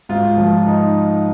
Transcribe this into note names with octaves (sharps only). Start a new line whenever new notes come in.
G#2 F4
F3
D#4